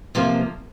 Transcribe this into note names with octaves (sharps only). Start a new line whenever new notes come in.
C3 F3 A#3